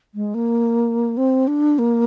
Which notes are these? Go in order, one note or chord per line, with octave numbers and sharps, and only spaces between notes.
G#3
A#3
C4
D4
A#3